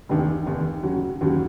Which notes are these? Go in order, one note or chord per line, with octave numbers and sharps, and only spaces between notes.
F1 D#2 D#3
F1 D#2 D#3
D#2 C#3 F#3
D#2 C#3 F#3